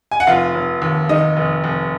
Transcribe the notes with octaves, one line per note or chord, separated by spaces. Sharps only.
G#5
F#5
F1 F4 F5
F1
D#2
D#3 D#4 D#5
F1
F1